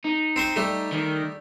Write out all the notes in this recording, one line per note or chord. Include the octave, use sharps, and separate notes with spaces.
D#4
C4 C5 C#6
G3 A3
D#3